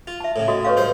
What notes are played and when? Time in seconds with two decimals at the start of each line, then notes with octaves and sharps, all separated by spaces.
0.07 F4
0.20 E5 A5
0.36 A2 C#3
0.48 F#4 A4 D#5
0.65 B4 C#5 F5
0.77 G2 C5 C6